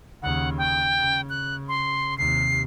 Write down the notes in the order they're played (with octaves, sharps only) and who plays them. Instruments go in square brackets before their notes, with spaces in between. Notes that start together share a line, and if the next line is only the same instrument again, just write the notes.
[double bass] D#2 C#3 [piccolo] F#5
[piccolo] G5
[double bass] C#3
[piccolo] F#6
C6
[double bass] D#2 C3 [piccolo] C7